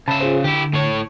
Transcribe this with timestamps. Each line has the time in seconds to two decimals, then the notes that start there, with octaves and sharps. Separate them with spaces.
0.08 C#3 E5 A5 B5
0.20 F4 G#4 C5
0.44 D3 E4 G4
0.74 A2 C#5